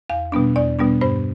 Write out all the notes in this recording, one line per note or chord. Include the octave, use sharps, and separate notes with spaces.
E2 F5
B2 G3 B3 D4
E2 D5
B2 G3 B3 D4
G2 C5